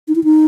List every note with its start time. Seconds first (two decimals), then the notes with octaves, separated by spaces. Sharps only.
0.08 D#4
0.15 E4
0.24 D#4